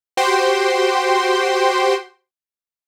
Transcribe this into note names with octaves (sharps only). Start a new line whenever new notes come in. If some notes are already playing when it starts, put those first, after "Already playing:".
F#4 G4 C5 G5 C6